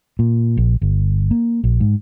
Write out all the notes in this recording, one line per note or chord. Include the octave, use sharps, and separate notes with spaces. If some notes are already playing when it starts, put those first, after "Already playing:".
A#2
A#1
G1
A#3
A#1
G#2